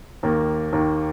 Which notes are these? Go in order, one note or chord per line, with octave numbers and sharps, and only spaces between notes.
D#2 D#3 A#3
D#2 D#3 A#3